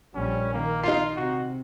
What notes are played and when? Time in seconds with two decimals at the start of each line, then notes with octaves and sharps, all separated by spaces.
0.15 A#1 G3 C#4
0.53 D#3 A#3
0.83 D#4 F4 C7
1.17 C3 F#4